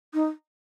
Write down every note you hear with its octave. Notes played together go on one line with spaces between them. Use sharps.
D#4